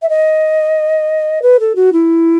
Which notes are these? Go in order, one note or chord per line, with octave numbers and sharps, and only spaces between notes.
E5
D#5
B4
A4
F#4
E4